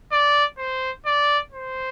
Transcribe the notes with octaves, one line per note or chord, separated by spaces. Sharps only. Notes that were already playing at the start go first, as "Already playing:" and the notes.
D5
C5
D5
C5